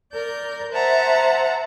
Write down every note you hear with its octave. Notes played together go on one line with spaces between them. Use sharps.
A#4 D5 G6
C5 E5 F#5 A5 A#5